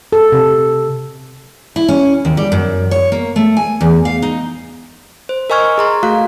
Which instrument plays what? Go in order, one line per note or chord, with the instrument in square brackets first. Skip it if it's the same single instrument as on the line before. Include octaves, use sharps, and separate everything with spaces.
[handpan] A4
C3
[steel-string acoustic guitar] E4
C#4
D#2
G3
F#2
C#5
A#3
A3
G#5
E2
F5
D#4
[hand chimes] C5
A#4 D#5 G#5 C#6 F6 G#6
G#4 A#5 C6
A3 F#4 F5 F#6